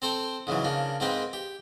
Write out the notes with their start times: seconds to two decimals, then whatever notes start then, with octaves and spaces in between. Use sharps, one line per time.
0.02 C4 A4 C5 G5
0.47 G#2 C#3 E3 F#3
0.64 C#3 A#3 D4
1.00 G#2 A#3 C4 B4 G5
1.33 G4